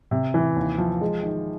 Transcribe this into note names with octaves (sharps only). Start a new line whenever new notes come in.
C3
E3
D#2
F3
G#3
D#3